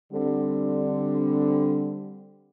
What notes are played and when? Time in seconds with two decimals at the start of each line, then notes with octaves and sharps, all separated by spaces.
0.13 D3 G3 C4